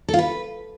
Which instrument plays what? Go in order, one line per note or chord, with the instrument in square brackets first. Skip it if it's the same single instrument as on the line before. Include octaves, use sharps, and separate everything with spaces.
[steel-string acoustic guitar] A4
F4
B4